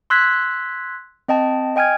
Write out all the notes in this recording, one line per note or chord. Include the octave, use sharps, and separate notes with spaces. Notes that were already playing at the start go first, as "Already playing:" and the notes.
C6 E6 F#6 G#6 B6
C4 D#5 G5 A5
D#5 G5 G#5 F6 G#6